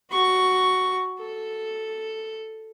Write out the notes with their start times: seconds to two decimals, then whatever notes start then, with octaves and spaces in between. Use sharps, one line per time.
0.11 F#4 C#6
1.19 A4